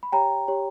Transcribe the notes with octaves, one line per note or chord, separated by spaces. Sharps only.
B5
G4 C#5 G5 A#5
G4 C#5